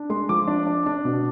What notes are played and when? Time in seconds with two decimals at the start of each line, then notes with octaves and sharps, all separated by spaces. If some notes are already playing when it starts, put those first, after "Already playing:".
Already playing: D4
0.10 G#3 C6
0.29 F3 D6
0.48 D4
0.67 D4
0.86 D4
1.05 B2